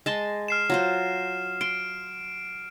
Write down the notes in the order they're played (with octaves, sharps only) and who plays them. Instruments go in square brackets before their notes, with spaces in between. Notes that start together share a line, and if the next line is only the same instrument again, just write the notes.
[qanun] G#3 A5 C6
[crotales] F6 C7 E7
[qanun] F#3 F4 C5
[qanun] C6 [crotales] D7